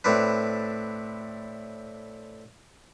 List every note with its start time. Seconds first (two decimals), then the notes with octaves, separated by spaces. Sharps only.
0.04 A2 C4 D4 B4